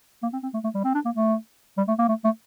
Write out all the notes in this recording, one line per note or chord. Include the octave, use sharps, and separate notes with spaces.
A#3
C4
C4
A3
A3
G3
C4
D4
A#3
A3
G3
A3
A#3
A3
A3